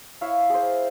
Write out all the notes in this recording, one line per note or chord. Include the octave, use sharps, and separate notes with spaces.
E4 C#5 E5 F5
G#4 C5